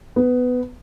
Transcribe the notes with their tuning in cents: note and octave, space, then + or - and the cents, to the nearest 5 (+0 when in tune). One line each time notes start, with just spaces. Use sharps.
B3 +15